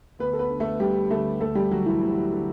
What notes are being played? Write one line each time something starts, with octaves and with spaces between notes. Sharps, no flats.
D2 B3 B4
A4
B3 B4
D3
A3 A4
D2 G3 G4
D3 A3 A4
D2 A3 A4
G3 G4
D3 F#3 F#4
E3 E4
D2
D3